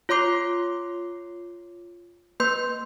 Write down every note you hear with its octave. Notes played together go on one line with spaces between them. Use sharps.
F4 C#5 C6 D6 C7
A#3 B4 C6 G6